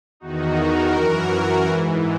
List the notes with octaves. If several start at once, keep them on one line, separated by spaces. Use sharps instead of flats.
E2 D#3 D#4 F#4
F#4 A#4
F#2 E3
G#2 E3